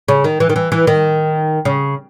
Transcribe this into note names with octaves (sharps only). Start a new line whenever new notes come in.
C#3
D#3
E3
D#3
E3
E3
D#3
C#3